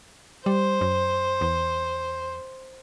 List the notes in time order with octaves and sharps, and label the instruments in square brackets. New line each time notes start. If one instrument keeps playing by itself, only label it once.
[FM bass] G3 [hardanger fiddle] C5
[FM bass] F#2
E2